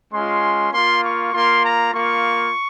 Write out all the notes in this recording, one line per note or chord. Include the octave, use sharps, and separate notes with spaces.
G#3 C#4 F4 C6
A#3 F4 C6
C#6
A#3 F4 C6
A#5
A#3 F4 C#6